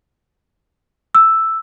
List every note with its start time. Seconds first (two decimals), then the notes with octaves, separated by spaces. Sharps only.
1.15 E6